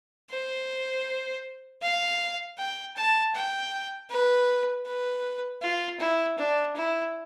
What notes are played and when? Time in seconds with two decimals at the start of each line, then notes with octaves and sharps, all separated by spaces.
0.30 C5
1.82 F5
2.58 G5
2.96 A5
3.34 G5
4.10 B4
4.86 B4
5.62 F4
6.00 E4
6.38 D4
6.76 E4